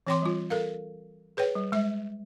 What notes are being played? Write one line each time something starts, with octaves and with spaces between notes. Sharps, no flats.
E3 C4 C#5 G5 C6 D6
G3 F4
A4 A#4 F5
G#4 B4 C#5 G5
G3
G#3 E5